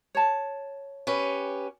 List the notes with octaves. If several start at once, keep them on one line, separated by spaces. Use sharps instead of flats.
C#5 A5
C#4 G4 B4